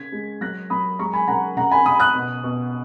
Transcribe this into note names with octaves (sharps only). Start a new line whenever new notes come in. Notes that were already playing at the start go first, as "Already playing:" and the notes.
Already playing: C#3 G#6 B6
G#3
F#3 F#6 A#6
F#3 B5 D#6
G#3 A#5 C#6
G#5 B5
C#3 F#5 A#5
C#3 F#5 A#5
G#5 B5
C#3 B5 D#6
D#6 F#6
B2
B2